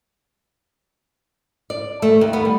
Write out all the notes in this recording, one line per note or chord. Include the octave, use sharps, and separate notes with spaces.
D5
A3
D#2
B3
G3